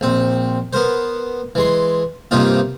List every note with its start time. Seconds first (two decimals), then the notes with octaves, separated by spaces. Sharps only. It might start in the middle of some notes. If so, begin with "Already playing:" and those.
0.01 A#1 C4
0.73 B3 A#4 C5
1.55 E3 G#3 C6
2.31 G2 C3 A#3 D#4 F4